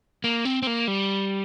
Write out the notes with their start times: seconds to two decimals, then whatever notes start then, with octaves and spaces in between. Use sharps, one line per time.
0.24 A#3
0.45 C4
0.62 C4
0.67 A#3
0.88 G3